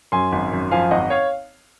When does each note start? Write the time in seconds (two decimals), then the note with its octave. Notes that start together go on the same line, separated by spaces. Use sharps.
0.12 F#2 G#5 C6
0.32 G#1
0.52 F#2
0.71 F3 F5 G#5
0.91 G#1 D#5 F#5
1.10 C#5 F5